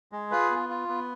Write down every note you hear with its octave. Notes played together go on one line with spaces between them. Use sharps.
G#3
F4 G#4 B4
B3
F4
B3